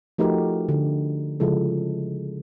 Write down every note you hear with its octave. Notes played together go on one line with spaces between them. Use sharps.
F3 A3 D#4 F#4 G4 A#4
D3
C#3 F3 G#3 E4 A4